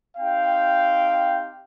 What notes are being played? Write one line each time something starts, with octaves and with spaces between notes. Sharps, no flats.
C4 D#4 G4 F5 G5